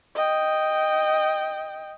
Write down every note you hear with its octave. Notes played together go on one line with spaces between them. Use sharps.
D#5 G5